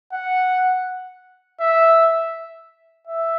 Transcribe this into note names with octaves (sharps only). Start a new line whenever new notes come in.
F#5
E5
E5